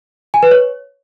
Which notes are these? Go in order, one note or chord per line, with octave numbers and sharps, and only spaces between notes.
G#5
B4
C#5